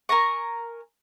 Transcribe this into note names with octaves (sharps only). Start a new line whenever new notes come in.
A#4 G#5 A#5 C#6